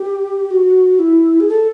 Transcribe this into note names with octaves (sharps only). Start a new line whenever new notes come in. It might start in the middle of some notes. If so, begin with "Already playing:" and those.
Already playing: G4
F#4
E4
G#4
A4